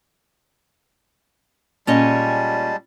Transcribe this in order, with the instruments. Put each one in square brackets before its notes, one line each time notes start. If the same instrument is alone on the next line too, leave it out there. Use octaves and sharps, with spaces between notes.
[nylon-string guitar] A#2 C#4 D#5 [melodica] G3 G#3 A5